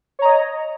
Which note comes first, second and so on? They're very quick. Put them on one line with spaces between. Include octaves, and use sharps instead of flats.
C#5 A#5 D#5